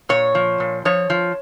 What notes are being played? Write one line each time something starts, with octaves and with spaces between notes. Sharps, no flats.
A#2 C#5
F3
A#2
F3 C#5
F3